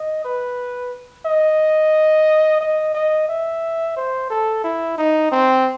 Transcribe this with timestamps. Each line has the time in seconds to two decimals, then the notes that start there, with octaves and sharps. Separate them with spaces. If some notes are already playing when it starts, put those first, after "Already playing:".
Already playing: D#5
0.25 B4
1.26 D#5
2.61 D#5
2.95 D#5
3.29 E5
3.97 C5
4.30 A4
4.64 E4
4.98 D#4
5.32 C4